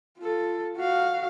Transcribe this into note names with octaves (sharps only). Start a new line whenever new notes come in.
F4 A4
F#4 F5